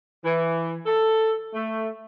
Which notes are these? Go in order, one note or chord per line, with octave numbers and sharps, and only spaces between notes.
E3
A4
A3